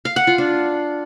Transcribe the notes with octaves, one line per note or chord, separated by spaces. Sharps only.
F5
F#5
F4
D4